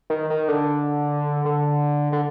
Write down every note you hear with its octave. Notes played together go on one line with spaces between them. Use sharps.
D#3
D#3
D3
D3
D3